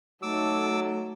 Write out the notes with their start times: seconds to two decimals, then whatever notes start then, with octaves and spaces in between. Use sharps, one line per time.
0.23 F#3 A3 D#4 A4 D6 E6